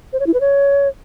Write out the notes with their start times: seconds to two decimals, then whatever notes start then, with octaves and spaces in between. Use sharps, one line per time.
0.13 C5
0.20 C#5
0.27 E4
0.34 B4
0.41 C#5